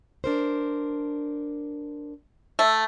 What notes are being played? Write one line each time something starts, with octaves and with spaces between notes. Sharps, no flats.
D4 A#4 C5
A3